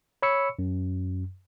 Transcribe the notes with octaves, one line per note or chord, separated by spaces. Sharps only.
C#5 B5 C#6 E6 C#7
F#2